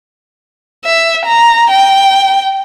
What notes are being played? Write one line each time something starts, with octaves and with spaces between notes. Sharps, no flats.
E5
A#5
G5